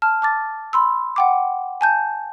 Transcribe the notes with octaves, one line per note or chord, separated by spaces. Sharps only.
A5 F6
A5 D6 A6
B5 C6 E6
F#5 G5 D6
G#5 A5 G6